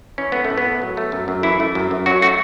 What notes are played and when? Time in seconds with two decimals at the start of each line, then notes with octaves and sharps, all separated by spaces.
0.18 E3 C#4
0.32 A3 B3
0.45 A3
0.50 A2
0.58 B3
0.66 A2
0.82 F#3
0.97 A3
1.12 F#2
1.28 F#2
1.43 E3 E4
1.60 A3
1.75 F#2
1.91 F#2
2.06 F#3 F#4
2.21 A3 F#4